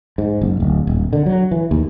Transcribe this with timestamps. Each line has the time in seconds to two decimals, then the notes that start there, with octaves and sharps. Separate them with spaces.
0.18 G#2
0.41 F#1
0.60 D1
0.87 D#1
1.13 D3
1.26 F#3
1.51 E3
1.71 D#2